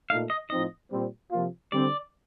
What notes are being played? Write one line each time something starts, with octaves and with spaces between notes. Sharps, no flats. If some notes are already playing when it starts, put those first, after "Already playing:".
A#2 A3 D#4 F5
D#5
A2 F3 C4 D#4 D#5
A#2 G3 C4
C3 F3 A#3 F4
D3 G3 C4 D5